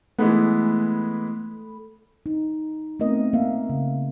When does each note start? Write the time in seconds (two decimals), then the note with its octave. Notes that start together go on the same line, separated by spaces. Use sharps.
0.19 E3 G#3 A3 B3 A4 B5
2.26 D#4
3.00 A3 B3 C4 A#4 D#5
3.33 A#3 E5 F5
3.70 C#3